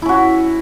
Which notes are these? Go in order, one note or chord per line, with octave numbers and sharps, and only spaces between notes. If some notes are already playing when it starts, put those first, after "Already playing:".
C#4 E4 F#4